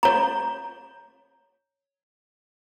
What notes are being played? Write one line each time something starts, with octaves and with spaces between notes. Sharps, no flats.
C#5 A#5